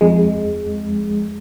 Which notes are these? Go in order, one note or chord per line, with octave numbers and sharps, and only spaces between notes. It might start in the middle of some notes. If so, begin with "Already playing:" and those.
F2 G#3